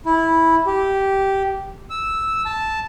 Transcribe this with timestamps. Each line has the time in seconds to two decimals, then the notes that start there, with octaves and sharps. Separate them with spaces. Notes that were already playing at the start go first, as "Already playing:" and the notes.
0.06 E4
0.67 G4
1.90 E6
2.46 A5